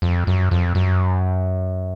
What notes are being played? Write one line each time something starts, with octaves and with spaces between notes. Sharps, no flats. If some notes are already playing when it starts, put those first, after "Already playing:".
F2
F#2
F2
F#2